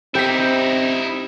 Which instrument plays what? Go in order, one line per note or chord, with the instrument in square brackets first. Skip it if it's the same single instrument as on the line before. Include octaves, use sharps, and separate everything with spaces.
[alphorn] C4 [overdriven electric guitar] D#4 E4 [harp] G4 B6